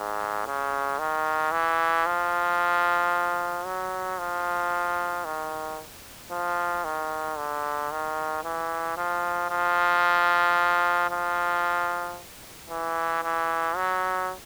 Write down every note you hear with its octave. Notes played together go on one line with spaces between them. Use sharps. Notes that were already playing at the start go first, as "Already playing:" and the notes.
Already playing: G#2
C#3
D#3
E3
F3
F#3
F3
D#3
F3
D#3
D3
D#3
E3
F3
F3
F3
E3
E3
F#3